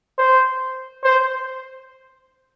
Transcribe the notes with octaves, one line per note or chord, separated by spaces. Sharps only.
C5
C5